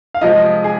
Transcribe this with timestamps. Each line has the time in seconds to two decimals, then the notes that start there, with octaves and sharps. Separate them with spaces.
0.14 F5
0.21 C3 F3 G#3 D#5
0.64 G#4